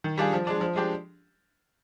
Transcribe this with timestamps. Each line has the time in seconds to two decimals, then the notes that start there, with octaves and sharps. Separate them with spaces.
0.04 D#3
0.18 G3 D4 F4 G#4
0.33 F3
0.47 G#3 D4
0.61 F3
0.76 G#3 D4 G4